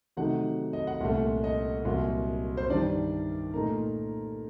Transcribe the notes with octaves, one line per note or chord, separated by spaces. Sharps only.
C3 D#3 F#3 A3 D#4 F#5
D#5
F#5
C2 A#2 A3
D#5
C2 A#2 F#3
C5
G2 D#3 G3 D4 D5
A#2 A3 D#4 A#4